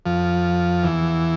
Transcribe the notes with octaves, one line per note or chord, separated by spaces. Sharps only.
F2 F3
E2 E3